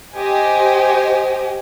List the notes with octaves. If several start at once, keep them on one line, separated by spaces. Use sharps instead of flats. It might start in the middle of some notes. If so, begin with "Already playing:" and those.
G4 C5 D#5 G#5